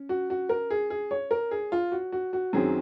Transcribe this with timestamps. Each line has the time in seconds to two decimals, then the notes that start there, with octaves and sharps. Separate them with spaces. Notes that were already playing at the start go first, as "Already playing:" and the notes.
Already playing: C#4
0.09 F#4
0.30 F#4
0.49 A#4
0.70 G#4
0.90 G#4
1.11 C#5
1.31 A#4
1.51 G#4
1.72 F4
1.92 F#4
2.12 F#4
2.33 F#4
2.53 F#2 D#3 F#3 C4 G#4